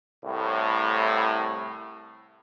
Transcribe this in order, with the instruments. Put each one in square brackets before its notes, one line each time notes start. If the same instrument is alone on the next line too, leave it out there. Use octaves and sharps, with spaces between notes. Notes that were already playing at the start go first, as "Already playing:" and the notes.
[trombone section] C2 A2